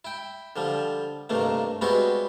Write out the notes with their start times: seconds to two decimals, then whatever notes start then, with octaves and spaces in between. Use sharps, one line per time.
0.05 E4 G5
0.56 D3 F3 G3
1.30 G2 C3 D#3 A3 A#3
1.81 G3 G#3 B3 C4 E4 F#4